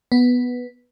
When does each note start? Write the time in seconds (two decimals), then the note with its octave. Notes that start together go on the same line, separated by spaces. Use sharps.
0.12 B3